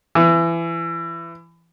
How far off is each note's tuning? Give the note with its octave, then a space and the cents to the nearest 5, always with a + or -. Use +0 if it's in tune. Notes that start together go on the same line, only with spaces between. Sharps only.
E3 +25